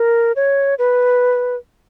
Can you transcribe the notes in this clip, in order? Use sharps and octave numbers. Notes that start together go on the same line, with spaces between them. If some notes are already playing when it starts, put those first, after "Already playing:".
Already playing: A#4
C#5
B4